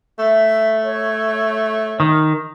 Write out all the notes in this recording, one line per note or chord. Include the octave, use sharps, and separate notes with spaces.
A3 E5
C#5
D#3